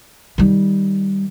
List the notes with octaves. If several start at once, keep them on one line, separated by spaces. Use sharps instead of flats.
D#3 G3